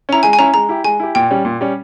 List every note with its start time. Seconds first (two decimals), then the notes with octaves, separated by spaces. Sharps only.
0.09 C#4 E4 A#5
0.23 G#3 G#5
0.33 G#5
0.39 C#4 E4 A#5
0.54 G#3 A#5
0.69 E4 G4
0.84 G#3 G#5
1.00 E4 G4
1.15 A#2 G5
1.31 G3 C#4
1.45 A#2
1.61 G3 C#4